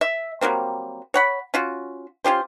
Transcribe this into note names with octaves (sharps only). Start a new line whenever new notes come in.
E5
F#3 G3 A#3 C4
C#5 F#5 B5
C#4 F4 F#4
C#4 F4 G4 C5